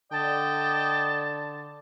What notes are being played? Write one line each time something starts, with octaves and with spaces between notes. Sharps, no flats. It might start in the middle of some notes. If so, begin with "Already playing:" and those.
D3 D5 D#5 G5 A5